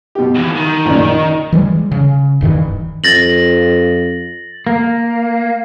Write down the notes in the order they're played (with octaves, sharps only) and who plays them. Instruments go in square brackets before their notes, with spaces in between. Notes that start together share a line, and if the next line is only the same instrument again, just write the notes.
[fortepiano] B2 G4
[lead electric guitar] D#2 E3
D#3
[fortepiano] A#1 F#2 A#2
D#4
[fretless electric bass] E3 G3 G#3
C#3
D#1 G2 D#3 E3
[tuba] F2 [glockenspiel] A6 A#6 F#7
[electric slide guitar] A#3